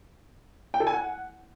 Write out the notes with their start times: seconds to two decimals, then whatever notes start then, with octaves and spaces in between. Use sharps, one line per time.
0.74 G5
0.80 A4
0.87 G#5
0.93 F#5